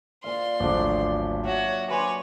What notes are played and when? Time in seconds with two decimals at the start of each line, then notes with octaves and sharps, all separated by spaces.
0.24 A#2 D5 F5 C6
0.60 G#1 D2 F3 F#3 D4 D6
1.45 F#4 C#5 E5
1.90 B4 C#5 G#5 C6 D6